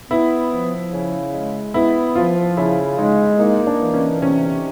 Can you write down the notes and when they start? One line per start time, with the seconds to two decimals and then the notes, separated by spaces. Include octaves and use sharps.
0.11 B3 E4
0.51 F3
0.92 C#3
1.33 G#3
1.74 B3 E4
2.15 F3 F4
2.57 C#3 E4
2.98 G#3 D#4
3.39 A#3 D#4
3.67 D4
3.80 E3
3.94 C#4
4.21 C3 C#4